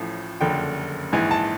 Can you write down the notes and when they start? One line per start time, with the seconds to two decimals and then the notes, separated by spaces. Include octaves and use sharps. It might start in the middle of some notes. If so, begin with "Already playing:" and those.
Already playing: A1 A2 F3
0.41 F#1 F2 D3 G5
1.13 A#1 G#2 E3 G#5
1.31 A5